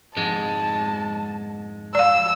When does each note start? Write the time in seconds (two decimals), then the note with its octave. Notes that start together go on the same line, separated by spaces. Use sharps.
0.17 F2 G#2 G#3 A5
1.95 D5 F5 E6